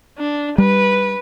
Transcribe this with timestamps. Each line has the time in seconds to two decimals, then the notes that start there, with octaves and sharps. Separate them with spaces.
0.19 D4
0.58 G3 B4